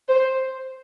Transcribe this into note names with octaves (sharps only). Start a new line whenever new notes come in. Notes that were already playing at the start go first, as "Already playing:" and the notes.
C5